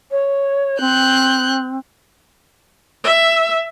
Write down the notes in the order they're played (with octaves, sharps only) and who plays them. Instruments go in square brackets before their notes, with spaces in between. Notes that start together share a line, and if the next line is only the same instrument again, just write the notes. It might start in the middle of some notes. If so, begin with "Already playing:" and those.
[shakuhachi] C#5
[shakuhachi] C4 [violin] F#6 G6
[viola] E5